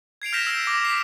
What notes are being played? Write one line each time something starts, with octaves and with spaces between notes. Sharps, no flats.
G#6 C7 D7 F7
F6 G6 A#6 B6 E7 F7
E6 B6
D6
B6 C7